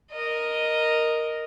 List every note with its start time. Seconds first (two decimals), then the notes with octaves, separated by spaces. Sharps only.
0.11 A#4 D#5